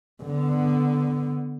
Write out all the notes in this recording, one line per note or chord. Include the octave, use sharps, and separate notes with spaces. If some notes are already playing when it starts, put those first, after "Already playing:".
D3 B3